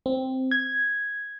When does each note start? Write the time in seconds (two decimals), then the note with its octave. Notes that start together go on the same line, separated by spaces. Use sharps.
0.06 C4
0.51 G#6